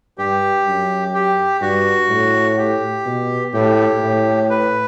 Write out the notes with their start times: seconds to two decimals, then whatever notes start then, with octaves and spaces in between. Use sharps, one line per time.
0.18 G2 G4
0.66 F#2
1.14 G4
1.61 G2 F#4
2.09 A2
2.58 G4
3.06 B2
3.53 A2 G4
4.02 A2
4.50 B4